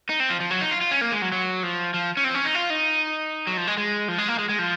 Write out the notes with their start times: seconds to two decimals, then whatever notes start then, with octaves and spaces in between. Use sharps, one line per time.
0.09 D#4
0.20 C4
0.30 F3
0.40 F3
0.51 F#3
0.61 D#4
0.71 F4
0.81 F4
0.91 C#4
1.01 A#3
1.12 G#3
1.22 F#3
1.32 F#3
1.63 F3
1.94 F3
2.17 C#4
2.24 C4
2.35 C#4
2.45 D#4
2.55 F4
2.70 D#4
3.47 F#3
3.57 F3
3.67 G#3
3.77 G#3
4.08 F3
4.18 G#3
4.28 A#3
4.39 G#3
4.49 G#3
4.59 F3